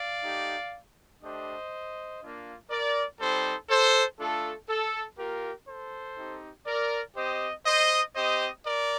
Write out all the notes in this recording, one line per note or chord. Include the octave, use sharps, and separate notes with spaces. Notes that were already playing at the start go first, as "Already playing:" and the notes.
Already playing: D5 F5
A3 D#4 G4
A3 D4 G4 C5 D#5
A#3 D4 F4
A#4 D5
G3 C4 D#4 A4 C5
A4 C5
A3 D4 F4 A4
A4
A#3 F4 G4 A#4
A4 C5
C4 D#4 G4
A#4 D5
C4 G4 C5 D#5
C5 D#5
C4 G4 C5 D#5
A#4 D5